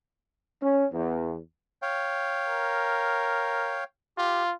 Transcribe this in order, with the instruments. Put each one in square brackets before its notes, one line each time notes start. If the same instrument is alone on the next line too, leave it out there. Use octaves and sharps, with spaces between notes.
[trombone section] C#4
E2
[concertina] C#5 F5 G5
[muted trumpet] A#4
[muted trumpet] F4 [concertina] G4